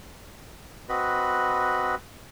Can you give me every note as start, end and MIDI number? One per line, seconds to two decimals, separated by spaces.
0.89 1.95 60
0.89 1.95 66
0.89 1.95 71
0.89 1.95 75
0.89 1.95 83